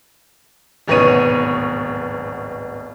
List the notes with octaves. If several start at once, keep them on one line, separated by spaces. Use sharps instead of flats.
D1 G#1 B2 B3 C#5 D#7